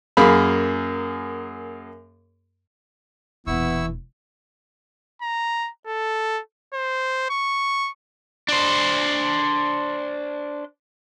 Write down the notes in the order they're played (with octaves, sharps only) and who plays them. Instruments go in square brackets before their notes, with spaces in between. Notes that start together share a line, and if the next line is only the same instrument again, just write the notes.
[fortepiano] F#2 A#3 G#4 F5 B5
[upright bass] E1 A#2 [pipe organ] E3 [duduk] B3 [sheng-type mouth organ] E4 C#6 E6
[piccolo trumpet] A#5
A4
C5
C#6
[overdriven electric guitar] D4 C5